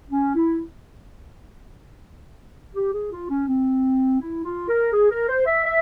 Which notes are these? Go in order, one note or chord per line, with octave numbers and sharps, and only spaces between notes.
C#4
E4
G4
G#4
F4
C#4
C4
E4
F4
A#4
G#4
A#4
C5
E5
E5